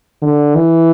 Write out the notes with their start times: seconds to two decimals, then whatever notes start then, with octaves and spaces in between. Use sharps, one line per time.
0.22 D3
0.56 E3